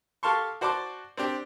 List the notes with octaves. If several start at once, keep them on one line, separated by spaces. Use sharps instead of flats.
G4 A4 F5 A5 C6 C#6
F#4 C5 D5 A5 C6 D6
C4 D4 G4